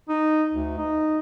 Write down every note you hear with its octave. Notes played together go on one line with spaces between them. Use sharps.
D#4
D2
D#4